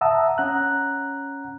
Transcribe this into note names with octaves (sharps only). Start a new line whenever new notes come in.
E5 F#5 A5 A#5 D#6 E6
C#4 F#5 A#5 F#6